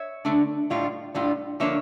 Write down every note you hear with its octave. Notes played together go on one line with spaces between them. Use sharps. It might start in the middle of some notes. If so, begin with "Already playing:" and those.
Already playing: C#5 E5
D3 A3 D4
A2 G3 D4 F4
A2 G3 D4 F4
D3 F3 A#3 D4 C#5 E5